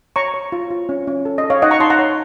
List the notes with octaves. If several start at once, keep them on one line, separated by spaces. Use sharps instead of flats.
C#5 A#5 C#6
C#5
F4
F4
C#4
C#4
A4
D#5
A4
C#5 F5
D#4 D#5 F#5
A#5 C#6
D#4 A5 C6
F#5 A#5
C#5